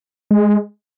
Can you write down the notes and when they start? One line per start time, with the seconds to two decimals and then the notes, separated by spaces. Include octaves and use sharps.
0.31 G#3